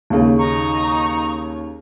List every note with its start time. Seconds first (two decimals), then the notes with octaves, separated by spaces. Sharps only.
0.10 D#2 C#3
0.38 D#4 A#5 C#6